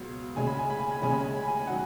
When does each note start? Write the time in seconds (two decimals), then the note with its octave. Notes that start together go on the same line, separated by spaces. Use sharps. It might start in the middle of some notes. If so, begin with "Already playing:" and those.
Already playing: C#2 B2 F#3 B3
0.36 D#2 C#3 G#3 G#5
0.47 B5
0.59 G#5
0.70 B5
0.80 G#5
0.91 B5
1.02 D#2 C#3 G#3 C#4 G#5
1.13 B5
1.25 G#5
1.36 B5
1.48 G#5
1.67 D#3 F#3 F#5